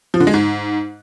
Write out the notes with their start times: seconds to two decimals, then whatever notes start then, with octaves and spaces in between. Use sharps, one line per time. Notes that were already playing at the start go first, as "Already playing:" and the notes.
0.14 F3
0.20 D3
0.27 G#3
0.34 G#2